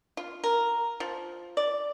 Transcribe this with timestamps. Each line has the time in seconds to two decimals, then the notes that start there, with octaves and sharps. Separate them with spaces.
0.17 F4
0.44 A#4
1.00 F3
1.57 D5